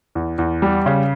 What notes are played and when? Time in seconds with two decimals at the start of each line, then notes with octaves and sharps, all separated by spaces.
0.15 E2
0.38 E2
0.62 G3
0.86 C#3